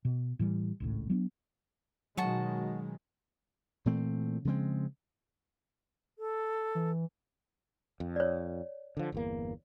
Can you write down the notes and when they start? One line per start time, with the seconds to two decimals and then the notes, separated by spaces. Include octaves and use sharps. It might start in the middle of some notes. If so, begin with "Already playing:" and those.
0.05 B2
0.39 A2 E3 G3
0.80 G#1 C#2 A2
1.10 F#3 B3 C#4 D4
2.17 B2 D#3 F#3 G#3 F#4 D#5 A5
3.86 A#2 E3 A3 C4
4.45 C#3 F3 G#3 C4
6.19 A4
6.75 E3
8.00 F2
8.16 C#5 D5
8.97 D3 F3
9.12 G1 E2 A#3